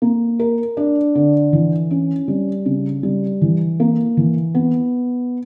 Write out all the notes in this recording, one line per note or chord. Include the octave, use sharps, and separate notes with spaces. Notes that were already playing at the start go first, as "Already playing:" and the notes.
A#3
A#4
D4
D3
E3
C#4
G3
C#3
G3
E3
A#3
E3
B3